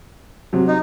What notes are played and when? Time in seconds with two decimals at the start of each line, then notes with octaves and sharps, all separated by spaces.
0.53 C3 F#3
0.68 D#4